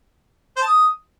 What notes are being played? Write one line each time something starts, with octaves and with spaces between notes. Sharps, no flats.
C5
A5
D#6